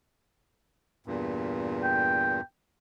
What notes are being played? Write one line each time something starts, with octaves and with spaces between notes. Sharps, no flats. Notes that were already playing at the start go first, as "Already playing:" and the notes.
E2 G2 A#2
G5